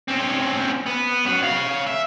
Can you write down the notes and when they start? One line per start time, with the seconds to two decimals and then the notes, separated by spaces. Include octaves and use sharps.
0.08 C4 C#4
0.86 B3
1.26 C#4 F#5
1.42 C#5 F5
1.87 E5